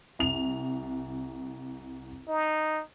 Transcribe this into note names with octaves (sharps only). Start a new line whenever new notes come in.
C2 F7
D#4